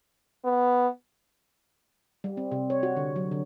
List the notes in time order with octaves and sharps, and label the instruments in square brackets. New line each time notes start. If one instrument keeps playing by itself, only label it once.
[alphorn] B3
[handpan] G3
C4
C3
C#5
F#4
D3
F#3
D3